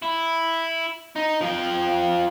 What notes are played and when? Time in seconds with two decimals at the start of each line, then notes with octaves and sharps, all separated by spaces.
0.02 E4
1.16 D#4
1.41 F3 G5